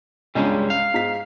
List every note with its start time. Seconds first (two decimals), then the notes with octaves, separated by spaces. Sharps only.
0.35 C#2 G2 G3 G#3 C#4
0.70 F5
0.94 G#2 B6